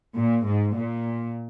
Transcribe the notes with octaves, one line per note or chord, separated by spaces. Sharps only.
A#2
G#2
A#2